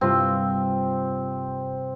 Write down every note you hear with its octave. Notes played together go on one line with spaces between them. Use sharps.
G2 C3 C4 F4